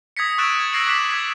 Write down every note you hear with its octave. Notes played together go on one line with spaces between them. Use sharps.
D#6 G#6 A#6 B6 C#7
C#6 E6 F#6 A6 D7 E7
G#6
E6 G#6 A#6 C7 D7 F#7
D6 F#6 B6 C7 E7
D#6 G#6 B6